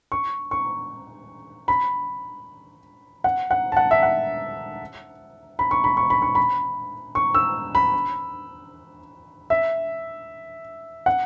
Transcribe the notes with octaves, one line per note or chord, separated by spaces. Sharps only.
C#6
C#6
B5
F#5
F#5
A5
F#5
E5
F#5
B5
C#6
B5
C#6
B5
C#6
B5
C#6
E6
B5
E5
F#5